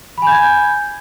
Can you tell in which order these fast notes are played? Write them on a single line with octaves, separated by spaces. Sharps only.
B5 G#5 G6 G#6